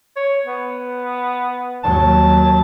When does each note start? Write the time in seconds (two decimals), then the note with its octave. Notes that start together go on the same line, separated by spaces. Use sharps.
0.16 C#5
0.45 B3
1.84 D#2 F#3 A5